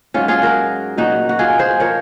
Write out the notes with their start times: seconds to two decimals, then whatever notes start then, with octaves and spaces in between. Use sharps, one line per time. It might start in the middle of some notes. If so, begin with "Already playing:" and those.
0.14 G#2 F#3 C#4 F4
0.28 F4 G#4
0.42 F#4 A#4
0.97 A#2 F#3 D#4 F#4
1.29 F#4
1.39 F4 G#4
1.59 G#4 C5
1.80 F3 A#4 C#5